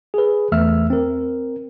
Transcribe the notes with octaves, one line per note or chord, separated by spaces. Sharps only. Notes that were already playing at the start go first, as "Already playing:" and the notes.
G#4 B4
E2 E3 A3 E5 E6 F6
C4 A#4